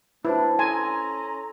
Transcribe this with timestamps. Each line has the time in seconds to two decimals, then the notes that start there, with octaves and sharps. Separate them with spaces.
0.25 F#3 A3 D4 E4 B4 C5 A5
0.59 C#4 A4 G#5 A#5 C6